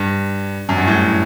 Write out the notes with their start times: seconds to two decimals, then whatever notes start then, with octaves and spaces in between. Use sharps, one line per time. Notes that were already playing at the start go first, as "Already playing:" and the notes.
Already playing: G2
0.69 F#2
0.78 G2
0.87 A2